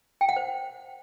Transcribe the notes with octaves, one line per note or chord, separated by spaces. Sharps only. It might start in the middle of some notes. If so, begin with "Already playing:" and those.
G5
F#5
C5